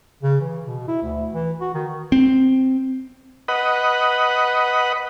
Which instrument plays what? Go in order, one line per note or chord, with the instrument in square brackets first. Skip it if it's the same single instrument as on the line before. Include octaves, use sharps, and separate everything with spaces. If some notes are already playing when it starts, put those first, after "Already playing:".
[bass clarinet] C#3
E3
B2
E4
D2
E3
F#4
D#3
[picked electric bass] C4
[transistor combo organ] B4 D#5 F#5